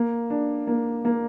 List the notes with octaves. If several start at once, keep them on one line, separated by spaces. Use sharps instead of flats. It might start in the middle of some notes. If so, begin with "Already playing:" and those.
Already playing: A#3
D4
A#3
A#3